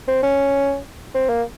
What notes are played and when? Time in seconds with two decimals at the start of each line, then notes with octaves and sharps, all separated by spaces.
0.08 C4
0.23 C#4
1.15 C4
1.29 A#3